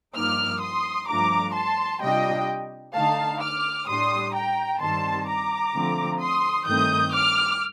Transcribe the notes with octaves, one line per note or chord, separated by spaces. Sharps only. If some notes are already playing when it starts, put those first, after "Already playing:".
G2 F3 A#3 D#4 D6 F6
C6 D#6
G2 F3 A3 D4 A#5 D6
A5 C6
C3 G3 D4 F4 D#5 G5
D3 A3 D#4 F5 A5
D6 F6
A2 G3 D4 C6 D#6
G5 A#5
G2 D#3 G3 C4 A5 C6
A#5 D6
D3 F3 A3 C4
C6 D#6
G2 D#3 A3 C4 D#6 G6
D6 F6